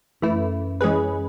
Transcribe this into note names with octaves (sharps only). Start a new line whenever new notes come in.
F#2 E3 A3 E4
E3 G#3 C#4 G#4 B4